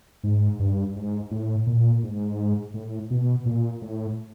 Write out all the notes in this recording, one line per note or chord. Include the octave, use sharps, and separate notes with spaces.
G#2
G2
G#2
A2
A#2
G#2
A2
B2
A#2
A2